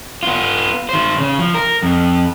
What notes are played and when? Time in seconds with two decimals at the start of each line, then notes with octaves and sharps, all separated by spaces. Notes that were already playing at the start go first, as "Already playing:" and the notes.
0.23 B3 F4
0.89 D#3 C5
1.18 C#3
1.39 F3
1.54 A#4
1.83 F2